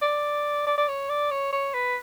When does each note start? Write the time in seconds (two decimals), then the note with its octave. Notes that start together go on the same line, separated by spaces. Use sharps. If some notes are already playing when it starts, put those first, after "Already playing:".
0.02 D5
0.67 D5
0.78 D5
0.88 C#5
1.09 D5
1.31 C#5
1.53 C#5
1.74 B4